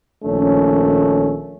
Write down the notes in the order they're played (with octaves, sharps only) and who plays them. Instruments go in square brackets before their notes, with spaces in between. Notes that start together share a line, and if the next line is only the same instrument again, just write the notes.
[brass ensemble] A#1 D#3 A3 C#4